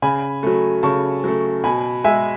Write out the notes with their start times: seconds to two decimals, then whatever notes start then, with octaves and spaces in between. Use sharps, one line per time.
0.02 C#3 G#5 B5
0.43 F#3 A3
0.83 C#3 A5 C#6
1.24 F#3 A3
1.64 B2 G#5 B5
2.04 G#3 E5 G#5